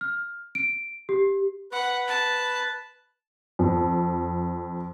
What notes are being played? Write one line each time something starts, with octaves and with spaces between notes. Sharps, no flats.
F6
D7
G4
B4 F#5
A5
F2